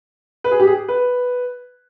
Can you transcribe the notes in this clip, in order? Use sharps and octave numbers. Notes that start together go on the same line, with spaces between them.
B4
G#4
G4
G#4
B4